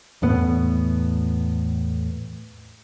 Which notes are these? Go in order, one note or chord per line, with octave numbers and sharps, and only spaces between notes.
E2 A2 B3